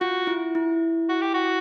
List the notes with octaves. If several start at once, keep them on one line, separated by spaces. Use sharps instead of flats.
F4 F#4
E4
E4
F#4
G4
F#4